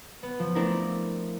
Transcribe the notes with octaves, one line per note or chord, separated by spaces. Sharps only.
B3
F3
A3 C4 D4 E4 A4 A#4